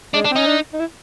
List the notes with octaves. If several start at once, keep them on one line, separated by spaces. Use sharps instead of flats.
G#3 D4
D4
C4
C#4 D#4
D4
D#4
E4